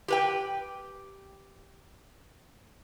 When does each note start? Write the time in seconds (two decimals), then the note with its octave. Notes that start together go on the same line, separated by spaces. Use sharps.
0.08 G4 B4 G5